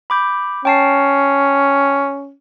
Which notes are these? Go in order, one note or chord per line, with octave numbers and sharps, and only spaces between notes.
B5 D6 G6
C#4 G5 A5 C7